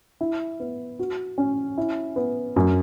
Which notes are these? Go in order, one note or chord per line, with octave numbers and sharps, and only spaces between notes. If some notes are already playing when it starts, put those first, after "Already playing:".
E4
B3
F#4
C#4
E4
B3
F#2